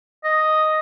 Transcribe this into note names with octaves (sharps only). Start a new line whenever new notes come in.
D#5